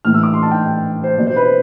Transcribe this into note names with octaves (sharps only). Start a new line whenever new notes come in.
A2 E3 F6
E6
D6
C6
A5
G5
C5
B2 D5
C5
B4
C5